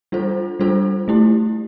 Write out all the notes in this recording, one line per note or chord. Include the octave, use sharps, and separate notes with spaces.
G3 D4 F4 A4 C5
G3 D4 F4 A4 C5
A3 E4 G4